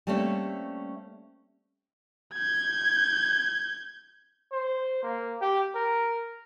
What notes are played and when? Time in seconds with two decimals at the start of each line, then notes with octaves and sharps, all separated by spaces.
0.07 G3 A3 A#3 C4 C#4 E5
2.34 G6 G#6
4.52 C5
5.03 A#3
5.41 G4
5.75 A#4